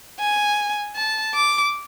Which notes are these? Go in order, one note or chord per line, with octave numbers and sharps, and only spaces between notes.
G#5
A5
D6